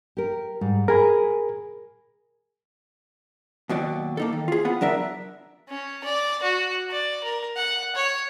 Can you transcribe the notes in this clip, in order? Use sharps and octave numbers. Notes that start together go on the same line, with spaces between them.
G4 A#4
G#2 G3
G#4 A#4 G#5 B5
D#2 B2 F#3 D5
A#3 D#4 A4
D#3
F4 G#4
B3 F4 F#5
F#3 D4 A#4 E5
C#4
D5
F#4
D5
A#4
F#5
C#5